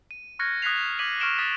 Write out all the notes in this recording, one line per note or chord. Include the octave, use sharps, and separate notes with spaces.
D#7
C#6 F6 F#6 G#6 A#6 C#7
D#6 F#6 G#6 B6 C7 F7
D6 F6 G#6 B6 D#7 F#7
C#6 F6 C#7 D7 E7 G7
D#6 A6 B6